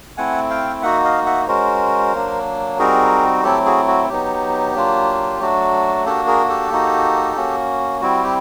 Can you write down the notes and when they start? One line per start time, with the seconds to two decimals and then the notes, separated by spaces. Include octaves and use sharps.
0.17 A3 C4 E4 F#5 G#5
0.50 F5 G5
0.82 A#3 D#4 F#4 E5 F#5
1.04 D#5 F5
1.26 E5 F#5
1.47 G#3 C#4 F#4 A#4 C5
2.14 F#3 A#3 D4
2.79 G3 C4 D#4 F#4 G#4 A#4
3.43 F#3 A3 C4 E4 G4 A4
3.66 F#4 G#4
3.88 F#4
4.09 F#3 B3 D#4 G4
4.75 F#3 A#3 D4 F4
5.40 F#3 A3 D4 F#4
6.05 A#3 D4 F#4 G4 A4
6.27 G#4 A#4
6.49 G4 A4
6.71 A#3 D#4 F#4
7.36 A#3 C#4 F#4
8.01 G3 C4 E4 F#4
8.24 G4